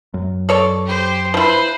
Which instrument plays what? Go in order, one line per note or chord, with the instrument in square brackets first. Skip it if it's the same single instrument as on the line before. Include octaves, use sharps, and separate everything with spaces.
[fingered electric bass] F#2
[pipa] A4 C#5 D5
[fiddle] G4 C5
[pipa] F3 E4 [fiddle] B4 C5